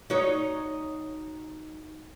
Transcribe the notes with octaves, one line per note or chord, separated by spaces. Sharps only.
D#4 F#4 C#5